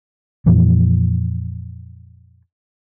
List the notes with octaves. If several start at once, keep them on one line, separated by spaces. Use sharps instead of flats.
F2 A#2 E3 F3